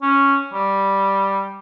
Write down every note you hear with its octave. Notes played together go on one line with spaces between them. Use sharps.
C#4
G3